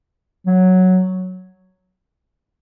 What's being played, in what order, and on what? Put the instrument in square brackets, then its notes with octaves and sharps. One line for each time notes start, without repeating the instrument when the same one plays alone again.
[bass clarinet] F#3